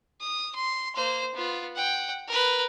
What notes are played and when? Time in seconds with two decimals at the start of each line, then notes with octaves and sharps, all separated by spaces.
0.21 D#6
0.55 C6
0.96 A#3 C5
1.34 B3 F4
1.76 F#5 G5
2.28 A#4 B4